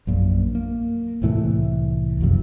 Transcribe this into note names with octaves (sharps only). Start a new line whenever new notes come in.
A#1 F#2 A#2
A#3
C2 A2 E3 A3
F#1 B1 F2 C3